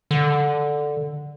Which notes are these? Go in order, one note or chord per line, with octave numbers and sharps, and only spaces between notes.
D3